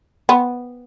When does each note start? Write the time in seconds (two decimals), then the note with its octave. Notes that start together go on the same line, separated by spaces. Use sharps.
0.29 B3